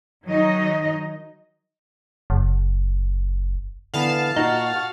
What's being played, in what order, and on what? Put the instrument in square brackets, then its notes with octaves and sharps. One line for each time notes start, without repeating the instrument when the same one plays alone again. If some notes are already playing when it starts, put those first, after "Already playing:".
[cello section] D#3 F#3 D#4 D#5
[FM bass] F#1
[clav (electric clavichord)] D3 E3 B3 [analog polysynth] F5 A5
[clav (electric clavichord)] A#2 [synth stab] D#4 [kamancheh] F#4